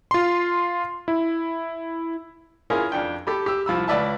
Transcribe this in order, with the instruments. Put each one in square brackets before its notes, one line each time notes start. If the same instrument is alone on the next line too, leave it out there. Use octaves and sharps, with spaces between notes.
[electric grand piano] F4 C6
E4
[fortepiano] C#4 E4 F4 G#4 A#4
F2 D4 G5
G4 A4 B5
G4 E6
C2 F3 B5 E6
C#2 B4 D5 E5 A5